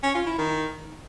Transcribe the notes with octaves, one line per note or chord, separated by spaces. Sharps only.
C#4
F4
E4
D#3